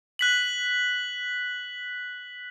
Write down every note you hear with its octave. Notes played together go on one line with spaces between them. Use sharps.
F#6 B6 F#7